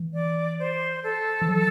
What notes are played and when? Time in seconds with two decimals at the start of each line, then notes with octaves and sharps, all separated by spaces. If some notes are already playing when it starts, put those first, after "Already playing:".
Already playing: E3
0.14 D5
0.59 C5
1.04 A4
1.41 E3
1.48 F#3